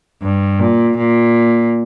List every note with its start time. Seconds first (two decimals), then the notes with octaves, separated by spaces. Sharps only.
0.22 G2
0.60 A#2
0.98 A#2